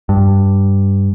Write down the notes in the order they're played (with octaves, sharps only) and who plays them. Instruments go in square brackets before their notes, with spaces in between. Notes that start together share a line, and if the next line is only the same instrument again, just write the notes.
[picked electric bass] G2